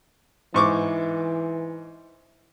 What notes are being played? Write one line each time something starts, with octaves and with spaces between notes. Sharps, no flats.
G#2 E3 C#6 D6